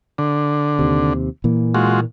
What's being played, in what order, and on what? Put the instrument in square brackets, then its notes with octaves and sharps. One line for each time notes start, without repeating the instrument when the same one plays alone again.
[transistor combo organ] D3
[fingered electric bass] D#2 C3
A#2 E3 A#3
[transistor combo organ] G#3 F4 F#4